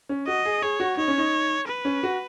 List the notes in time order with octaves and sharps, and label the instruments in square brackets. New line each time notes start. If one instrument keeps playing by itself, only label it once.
[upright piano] C#4
[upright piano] F#4 [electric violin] D#5
[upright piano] G#4
[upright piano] G#4 [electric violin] C#5
[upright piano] F#4
[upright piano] D#4 [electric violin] C#5
[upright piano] C#4
D#4
[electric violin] B4
[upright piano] C#4
F#4